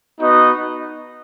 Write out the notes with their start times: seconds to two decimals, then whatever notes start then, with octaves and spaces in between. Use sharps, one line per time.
0.20 B3 D#4 F#4 D#5